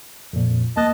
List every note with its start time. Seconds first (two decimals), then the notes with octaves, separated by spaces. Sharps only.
0.33 F2 A#2
0.77 D#2 A#3 D#5 A5 F#6